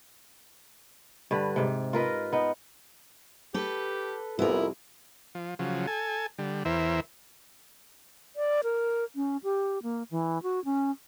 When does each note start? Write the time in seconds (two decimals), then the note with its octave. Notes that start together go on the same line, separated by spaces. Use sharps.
1.31 G2 D3 B4
1.56 G#2 C3
1.93 F4 A#4 B4 D#5
2.32 B3 D#4
3.54 G4 A4 B4
4.39 C2 F2 B3 E4 A#4
5.35 F3
5.59 C#3 F3 F#3
5.87 A4 G#5
6.38 D3 G3
6.65 E2 E3 A#4 C5 E5
8.36 D5
8.64 A#4
9.16 C#4
9.44 G4
9.83 A#3
10.11 E3
10.43 F#4
10.65 C#4